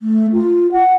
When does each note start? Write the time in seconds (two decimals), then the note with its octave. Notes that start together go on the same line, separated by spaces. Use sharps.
0.01 A3
0.32 F4
0.72 F#5